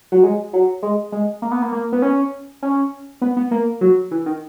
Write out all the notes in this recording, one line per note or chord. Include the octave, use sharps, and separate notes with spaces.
F#3
G#3
F#3
G#3
G#3
A#3
B3
A#3
A#3
B3
C#4
C#4
B3
B3
A#3
F#3
E3
D#3